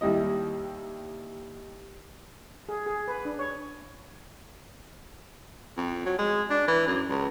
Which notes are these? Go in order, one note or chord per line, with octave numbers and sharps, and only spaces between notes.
D#2 G3 E4 D#5
G#4
G#4
B4
D4
C#5
F2
F#3
G#3
D4
E3
F#2
C#2